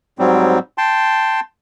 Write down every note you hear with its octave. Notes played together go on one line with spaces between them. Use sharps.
G#2 F#3 G3 C4
G5 A5 C6